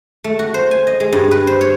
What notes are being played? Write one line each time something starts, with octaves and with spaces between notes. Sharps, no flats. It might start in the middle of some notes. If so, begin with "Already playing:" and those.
A3
F#4
C5
G#5
D#5
G#3
G2
B4
C5
C#5